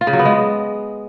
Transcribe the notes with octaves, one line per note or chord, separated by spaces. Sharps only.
F4
C#3
F#3
B3
G#3